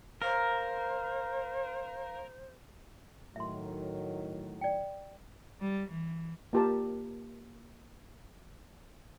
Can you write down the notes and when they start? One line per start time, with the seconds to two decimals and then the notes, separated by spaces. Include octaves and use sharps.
0.22 A#4 C5 F5 A#5
3.36 A2 D#3 F#3 E5 C6
4.61 D5 G5
5.61 G3
5.90 E3
6.53 A#3 F4 G4 A#4 A5